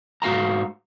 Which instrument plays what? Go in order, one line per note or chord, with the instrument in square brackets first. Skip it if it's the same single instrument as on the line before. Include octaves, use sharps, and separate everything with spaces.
[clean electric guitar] G#2 F#4 F5 G5 A#5